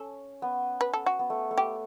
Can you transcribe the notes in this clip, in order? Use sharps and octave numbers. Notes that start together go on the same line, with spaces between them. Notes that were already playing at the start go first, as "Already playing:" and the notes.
Already playing: C#4 A4
B3
B4
A4
F#4
B3
A3
A3
G4